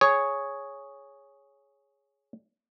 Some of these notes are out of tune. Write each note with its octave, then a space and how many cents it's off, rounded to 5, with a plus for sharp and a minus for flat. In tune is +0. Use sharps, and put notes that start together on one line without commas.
G#4 +0 C#5 +0